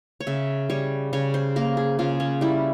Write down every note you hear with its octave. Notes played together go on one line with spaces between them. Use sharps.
C#5
C#3 E5
G3 C#5
C#3 C#5
C5
A#3 A#4
G#4
C#3 F4
C#4
G3 E4